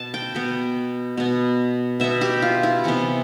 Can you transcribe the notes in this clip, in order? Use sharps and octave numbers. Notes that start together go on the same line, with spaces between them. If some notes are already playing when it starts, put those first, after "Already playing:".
Already playing: B2 B3 A5
G5
B2 B3
B2 B3
B2 B3 E5
G4
F4
E4
C3 E3 B3